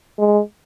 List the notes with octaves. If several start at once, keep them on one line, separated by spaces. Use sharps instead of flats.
G#3